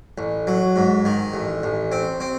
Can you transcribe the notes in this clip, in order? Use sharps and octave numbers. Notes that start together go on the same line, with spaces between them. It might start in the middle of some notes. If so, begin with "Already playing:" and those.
A1
F#3
G#2
D#3
A1
A1
C4
C4